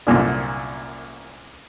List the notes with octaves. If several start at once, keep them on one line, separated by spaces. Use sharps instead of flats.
C2 F#2 A#2 D3